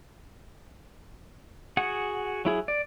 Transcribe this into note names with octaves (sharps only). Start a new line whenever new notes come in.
F#4 G#4 F#5
F#3 E4 G#4
D5